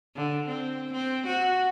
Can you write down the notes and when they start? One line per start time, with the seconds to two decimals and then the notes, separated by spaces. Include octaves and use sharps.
0.16 D3
0.48 C4
0.92 C4
1.26 F#4